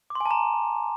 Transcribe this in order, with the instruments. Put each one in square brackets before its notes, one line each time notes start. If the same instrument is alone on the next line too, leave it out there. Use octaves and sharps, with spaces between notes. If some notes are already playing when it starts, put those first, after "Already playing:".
[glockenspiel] D6
C6
G#5
A5
A#5